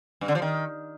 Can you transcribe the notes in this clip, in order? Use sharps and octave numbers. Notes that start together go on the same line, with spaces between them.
G2
D3
F3
D#3